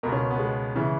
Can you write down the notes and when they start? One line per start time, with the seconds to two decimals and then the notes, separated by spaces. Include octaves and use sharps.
0.03 C#2 B2 A#4
0.12 C#4
0.31 B3
0.39 G#3
0.76 C#3 E3